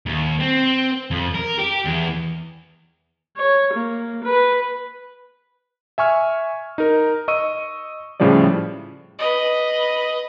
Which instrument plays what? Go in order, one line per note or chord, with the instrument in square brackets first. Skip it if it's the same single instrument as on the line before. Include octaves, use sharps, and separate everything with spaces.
[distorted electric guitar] D#2
C4
F2
A#4
G4
E2
[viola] C#5
A#3
B4
[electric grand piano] E5 G#5 C#6 F6
D#4 A#4
D#5 C#6 E6 D#7
A2 C#3 F3 G3 D5
[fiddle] B4 D#5